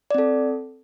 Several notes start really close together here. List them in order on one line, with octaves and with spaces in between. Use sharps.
D5 C4 A4